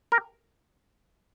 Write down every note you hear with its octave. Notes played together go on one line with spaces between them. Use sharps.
A#4